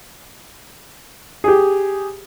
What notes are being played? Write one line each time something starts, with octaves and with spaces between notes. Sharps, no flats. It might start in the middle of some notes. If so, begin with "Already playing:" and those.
G4 G#4